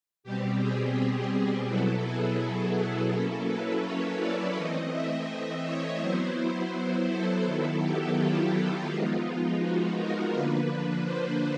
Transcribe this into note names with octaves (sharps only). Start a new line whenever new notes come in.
B2 G3 C4 G4
G#4
G4
B2 F#3 B3 E4 A4
G#4
F#3 A#3 C#4 E4 A4
B4
C#5
D5
E3 A3 C4 D#5
E5
C#5
F#3 B3 E4 C5
A4
D#3 F#3 B3 E4
G4
F4
F3 G#3 B3 D#4 F4
F#4
A#4
D3 F3 A#3 D4 B4
C5